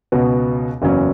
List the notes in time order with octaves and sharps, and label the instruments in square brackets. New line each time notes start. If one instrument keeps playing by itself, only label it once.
[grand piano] C#2 B2 B3 F#4
F#1 E2 C#3 F#3 C#4